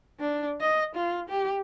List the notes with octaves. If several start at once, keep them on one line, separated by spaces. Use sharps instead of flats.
D4
D#5
F4
G4